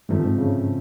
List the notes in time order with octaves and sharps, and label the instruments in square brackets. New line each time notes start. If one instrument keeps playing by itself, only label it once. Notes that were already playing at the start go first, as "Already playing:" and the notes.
[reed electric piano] G2 [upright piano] D3 F3 A3 C4
[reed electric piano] G#2
C#3